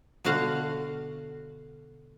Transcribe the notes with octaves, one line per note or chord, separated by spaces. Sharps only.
B2 D3 F#4 F5 F#5